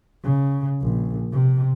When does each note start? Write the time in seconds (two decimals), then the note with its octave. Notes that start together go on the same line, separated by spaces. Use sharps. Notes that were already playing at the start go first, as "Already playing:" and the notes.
0.23 C#3
0.82 A#1
1.33 C3